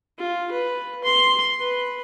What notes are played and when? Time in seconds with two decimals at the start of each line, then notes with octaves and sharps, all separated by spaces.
0.18 F4
0.51 B4
1.04 C6
1.60 B4